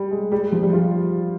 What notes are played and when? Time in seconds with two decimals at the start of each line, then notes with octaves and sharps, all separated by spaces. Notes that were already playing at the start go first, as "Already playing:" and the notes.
Already playing: G3
0.11 G#3
0.32 G3
0.52 F3
0.63 G3
0.73 F4